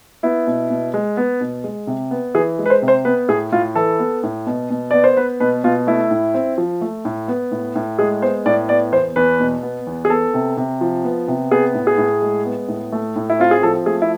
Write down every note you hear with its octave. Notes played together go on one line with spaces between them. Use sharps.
B3 E4
B2
B2
G#3
B3
B2
G#3
C3
B3
E3 G#4
G#3
B4
C5
C3
C5
B3 B4
A2 G#4
A2 F4
E3 A4
B3
A2
B2
B2
B3 D5
C5
B3 B4
B2 B4
B2 F4
A3 E4
A2
C4
F3
A3
A2
B3
A2
A2
G#3 G#4
B3 C5
A2 D5
B3 D5
E2 C5
E2 B4
B2
B3
E2
G#4
B3 A4
C3
C3
F3
B3
C3
B3 G#4
A2
G#4
A2
G#3
B3
A2
A3
A2
E4
C4 F4
G#4
F3 A4
A3 G#4
E4